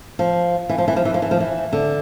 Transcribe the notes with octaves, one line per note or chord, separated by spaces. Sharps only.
F3
E3
F3
E3
F3
E3
F3
E3
F3
E3
D3